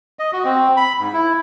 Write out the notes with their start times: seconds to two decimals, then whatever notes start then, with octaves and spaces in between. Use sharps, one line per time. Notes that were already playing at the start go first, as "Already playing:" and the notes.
0.19 D#5
0.33 F#4
0.44 C4
0.77 B5
0.99 G#2
1.13 E4